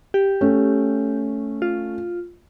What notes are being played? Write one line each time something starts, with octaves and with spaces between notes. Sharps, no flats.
G4
A3 C#4
F4